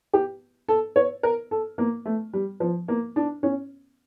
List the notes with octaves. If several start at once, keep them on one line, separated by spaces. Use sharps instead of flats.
G4
A4
C#5
A#4
A4
A#3
A3
G3
F3
A#3
D4
C#4